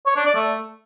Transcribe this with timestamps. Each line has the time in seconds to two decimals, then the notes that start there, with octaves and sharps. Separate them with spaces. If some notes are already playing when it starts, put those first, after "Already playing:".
0.07 C#5
0.16 D4
0.26 D5
0.35 A3